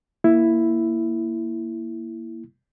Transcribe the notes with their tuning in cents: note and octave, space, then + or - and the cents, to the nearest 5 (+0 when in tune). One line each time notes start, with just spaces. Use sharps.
A#3 +0 E4 +5